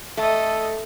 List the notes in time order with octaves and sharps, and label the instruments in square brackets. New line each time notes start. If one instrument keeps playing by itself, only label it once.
[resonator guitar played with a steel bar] A3 [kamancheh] A4 D#5